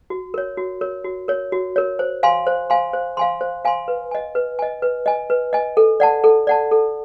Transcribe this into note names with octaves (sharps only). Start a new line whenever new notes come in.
F#4
A#4 C#5
F#4
A#4 C#5
F#4
A#4 C#5
F#4
A#4 C#5
C5
F5 G#5 C6
C5
F5 G#5 C6
C5
F5 G#5 C6
C5
F5 G#5 C6
B4
D#5 G#5
B4
D#5 G#5
B4
D#5 G#5
B4
D#5 G#5
A4
D5 F#5 A5
A4
D5 F#5 A5
A4